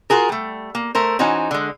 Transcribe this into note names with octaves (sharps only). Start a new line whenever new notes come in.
F4 F#4 G#4 A#4
G3 A3
A#3
A3 A#4 C5
E3 C#4 D#4 F#4 C5
D3 G#3